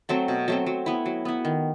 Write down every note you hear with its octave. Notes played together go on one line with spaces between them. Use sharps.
F#3 A3 C4
B2
F#3 A3 C4
F#3
B3 E4
F#3
B3 E4
D#3